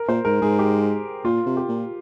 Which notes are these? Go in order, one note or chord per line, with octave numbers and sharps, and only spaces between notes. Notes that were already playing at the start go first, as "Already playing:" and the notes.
Already playing: A#4
A#2 C5
G#2 A#4
G#2 G#4
G4
A#2 F4
C3
G4
A#2